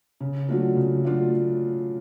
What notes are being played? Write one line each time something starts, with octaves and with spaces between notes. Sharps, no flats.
C#3
F#3 A3 D4 F4
C#3
F#3 A3 D4 F4